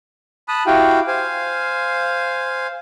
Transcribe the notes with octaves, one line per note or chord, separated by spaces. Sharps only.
A5 B5 D#6 F#6
E4 F#4 G4 F5 G5
C5 F5 G#5